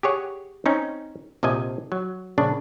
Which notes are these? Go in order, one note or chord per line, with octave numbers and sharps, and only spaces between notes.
G4 G#4 C#5 F#5
C4 C#4 D#4
A#1 C3 F3 D#5 G#5
F#3
A#1 C#3 D4